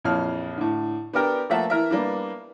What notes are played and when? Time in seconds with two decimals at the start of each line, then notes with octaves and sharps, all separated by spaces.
0.04 A#1 F2 E3 C#5 F5 F6
0.58 A2 D3
1.13 B3 D4 G4 A#4 G5
1.50 F3 A3 A#3 E5 F#5 A5
1.70 E3 A#4 E5
1.90 G3 A#3 B3 D4